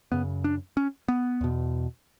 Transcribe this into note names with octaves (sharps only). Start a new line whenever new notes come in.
F#2 C#3 B3
D4
C#4
B3
E2 B2